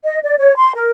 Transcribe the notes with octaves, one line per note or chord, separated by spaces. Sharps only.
D#5
D5
C#5
C6
A#4